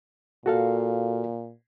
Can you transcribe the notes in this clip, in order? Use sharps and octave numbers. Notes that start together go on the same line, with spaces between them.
A#2 F#4 A4 F5